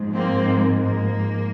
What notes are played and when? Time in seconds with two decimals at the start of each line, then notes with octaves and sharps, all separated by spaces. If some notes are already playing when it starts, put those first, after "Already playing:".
Already playing: G#2 F3 G#3
0.15 A#3 C4
0.81 A#3